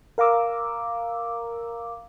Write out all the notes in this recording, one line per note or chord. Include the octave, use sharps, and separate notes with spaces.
A#4 F5 A#5 D6 E6